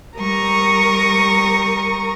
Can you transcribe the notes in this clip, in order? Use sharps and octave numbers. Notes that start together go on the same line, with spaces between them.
G3 A#4 A#5 C#6 D#6